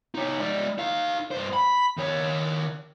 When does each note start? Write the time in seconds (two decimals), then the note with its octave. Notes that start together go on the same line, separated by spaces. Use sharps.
0.15 D#4 C#5
0.40 G#3 D5
0.78 D#4 F5
1.31 G2 C5
1.53 B5
1.98 D#3 C#5